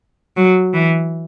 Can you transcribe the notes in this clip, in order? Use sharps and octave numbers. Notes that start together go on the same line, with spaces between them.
F#3
E3